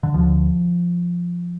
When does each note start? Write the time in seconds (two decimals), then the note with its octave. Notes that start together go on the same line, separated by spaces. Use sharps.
0.03 D3
0.14 D2 D3 F3